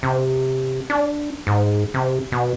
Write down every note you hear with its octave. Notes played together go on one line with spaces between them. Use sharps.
C3
D4
G#2
C3
B2